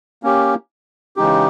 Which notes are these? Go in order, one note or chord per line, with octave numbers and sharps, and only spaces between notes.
A#3 C#4 G4
C#3 E3 G#3 D#4 G4